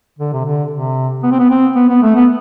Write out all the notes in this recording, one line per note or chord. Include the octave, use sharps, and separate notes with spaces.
D3
C3
D3
C3
B3
C4
B3
C4
B3
B3
A3
B3